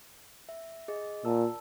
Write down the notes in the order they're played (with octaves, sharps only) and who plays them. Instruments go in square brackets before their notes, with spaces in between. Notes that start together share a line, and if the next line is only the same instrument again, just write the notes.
[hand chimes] E5
G#4 D#5
[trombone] A#2 [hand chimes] A5 E6